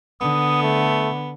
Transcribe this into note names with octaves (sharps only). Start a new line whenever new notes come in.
D3 B3 D#6
A3